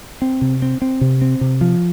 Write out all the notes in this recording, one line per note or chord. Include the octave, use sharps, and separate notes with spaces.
C4
C3
C4
C4
C3
C4
C3
F3